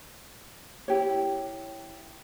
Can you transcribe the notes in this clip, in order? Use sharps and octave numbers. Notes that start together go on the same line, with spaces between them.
E4 G4 C#5